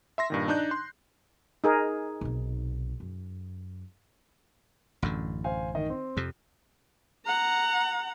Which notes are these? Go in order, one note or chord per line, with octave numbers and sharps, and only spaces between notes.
E5 C6 A#6
G2 A#2 D#3
D4 D#4 F#6 G6
C6
D#4 G#4 A#4
B1 C3
F#2
A1 F#2 D3
C5 F5 G#5
D#3 D#5
C4
F2 C3
F#5 A#5